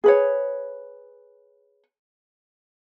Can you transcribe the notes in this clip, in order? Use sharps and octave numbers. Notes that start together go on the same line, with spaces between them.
G#4 B4 C#5